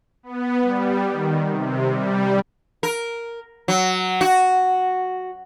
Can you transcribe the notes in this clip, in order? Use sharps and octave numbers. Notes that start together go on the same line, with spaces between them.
B3
G3
D#3
C3
G3
A#4
F#3
F#4